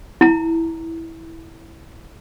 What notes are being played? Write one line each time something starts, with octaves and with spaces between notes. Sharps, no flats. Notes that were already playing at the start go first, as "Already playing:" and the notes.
E4 A#5